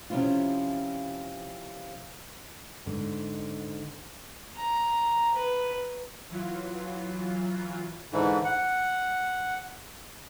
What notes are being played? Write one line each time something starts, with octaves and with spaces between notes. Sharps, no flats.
C3 F3 C#4 E4 F4
G#2 D3
A#5
B4
E3 F#3 F4
G#2 D3 E3
F#5